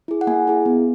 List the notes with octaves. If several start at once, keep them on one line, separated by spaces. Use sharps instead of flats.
E4 G#4
F#5
A#3 G#5
E4 G#4
B3